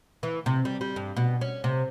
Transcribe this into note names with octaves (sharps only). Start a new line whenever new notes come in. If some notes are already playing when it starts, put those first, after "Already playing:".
E3
C3
G3
G3
G2
B2
C#4
C3